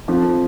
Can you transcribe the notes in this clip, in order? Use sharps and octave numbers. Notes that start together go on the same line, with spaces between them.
F2 F3